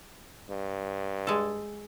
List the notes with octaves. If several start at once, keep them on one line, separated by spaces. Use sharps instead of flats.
G2
G#3 A4